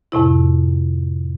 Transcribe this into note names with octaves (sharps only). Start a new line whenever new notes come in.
F2 A2 C3 E4